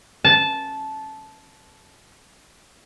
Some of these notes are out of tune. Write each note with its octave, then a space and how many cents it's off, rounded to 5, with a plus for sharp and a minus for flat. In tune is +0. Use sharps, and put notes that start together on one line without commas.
A5 -15